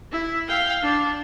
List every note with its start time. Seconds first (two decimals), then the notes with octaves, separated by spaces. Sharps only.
0.12 E4
0.48 F5 G5
0.83 D4